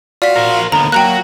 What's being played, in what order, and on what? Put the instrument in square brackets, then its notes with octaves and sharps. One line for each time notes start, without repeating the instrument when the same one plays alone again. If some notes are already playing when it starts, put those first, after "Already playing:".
[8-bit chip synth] F4 F#4 F5 [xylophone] D5 B6
[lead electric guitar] A#4 C5
[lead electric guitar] D#2 B3 [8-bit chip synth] D3 [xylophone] A#5
[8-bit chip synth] F#3 A#3 [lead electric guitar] F#4 [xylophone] G5 A#5 F#6